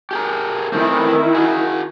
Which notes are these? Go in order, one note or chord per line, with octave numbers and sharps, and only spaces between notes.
G4 G#4 A#4
D#3 E3 A3 C4 E4
F#4 G#4